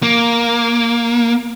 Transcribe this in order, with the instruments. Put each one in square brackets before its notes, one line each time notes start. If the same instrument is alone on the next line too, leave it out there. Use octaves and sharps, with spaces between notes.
[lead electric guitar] A#3